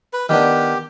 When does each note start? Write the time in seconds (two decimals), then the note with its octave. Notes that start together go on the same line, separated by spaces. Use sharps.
0.13 B4
0.29 D#3 B3 D4 G4